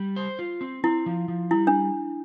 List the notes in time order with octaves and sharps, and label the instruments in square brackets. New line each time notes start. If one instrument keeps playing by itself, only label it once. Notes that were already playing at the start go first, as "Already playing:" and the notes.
Already playing: [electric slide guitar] G3
C5
F4
C4
[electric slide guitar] C4 [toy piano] E4
[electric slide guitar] F3
F3
[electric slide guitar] G3 [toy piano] E4
[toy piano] D4